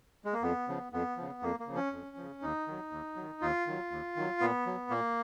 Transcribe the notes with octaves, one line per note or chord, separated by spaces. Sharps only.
G#3
A#3
F2 B3
C#3 F3
F2 B3
C#3 F3
F2 A#3
A#3
C#3 F3
C#4
F2
C#3 F3
D#2 D#4
D#3 F#3
D#2
D#3 F#3
D#2 F4
D#3 F#3
D#2
D#3 F#3
A#2 B3
F#3
A#2 A#3